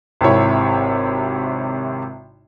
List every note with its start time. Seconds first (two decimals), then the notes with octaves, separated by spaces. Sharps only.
0.21 G#1 C3 E4 C#5